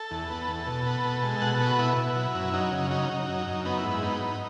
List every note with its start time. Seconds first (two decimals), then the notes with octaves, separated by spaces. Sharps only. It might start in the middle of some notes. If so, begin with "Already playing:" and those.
Already playing: A4
0.11 E2
0.30 B3
0.48 E2
0.67 B2
0.86 B3
1.05 B2
1.23 G#3
1.42 B2 F#5
1.54 A4
1.60 B3
1.67 F#4
1.79 B2 E4
1.97 B2
2.16 F#3
2.35 F#2
2.53 F#3 D#4
2.72 C#3
2.91 F#3 D#4
3.09 F#3
3.28 F#2
3.47 F#2
3.65 B3 D#4
3.78 E4
3.84 G#2
3.90 E4
4.02 B3 D#4
4.21 F#3